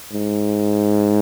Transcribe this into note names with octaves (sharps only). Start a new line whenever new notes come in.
G#2